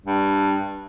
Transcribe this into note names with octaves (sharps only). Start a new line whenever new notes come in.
G2